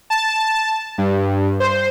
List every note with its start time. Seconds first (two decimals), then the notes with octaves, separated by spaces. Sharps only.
0.10 A5
0.98 G2
1.60 C5